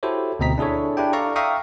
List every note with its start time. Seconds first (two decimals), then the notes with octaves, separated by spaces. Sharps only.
0.03 E4 F#4 G4 A4 C5 C#5
0.39 D2 B2 C4 D#5 A#5 B6
0.58 D4 E4 G#4 A4 C#5
0.97 D4 E4 G4 G5
1.13 A4 D5 F5 A#5 C#6
1.36 E5 F5 G5 A#5 C#6 D#6